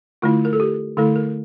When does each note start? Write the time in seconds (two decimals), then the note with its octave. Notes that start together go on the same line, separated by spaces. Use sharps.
0.22 D3 A3 E4 F4
0.45 A#4
0.53 A4
0.60 G4
0.97 D3 A3 E4 A4
1.16 A#4